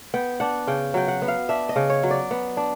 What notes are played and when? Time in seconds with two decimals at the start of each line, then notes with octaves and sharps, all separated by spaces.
0.14 B3 G5
0.40 D4 F#5
0.67 C#3 G5
0.94 F#3 G5
1.08 F#5
1.22 B3
1.28 F5
1.49 D4 E5
1.69 D#5
1.76 C#3
1.90 C#5
2.03 F#3
2.11 D5
2.31 B3
2.57 D4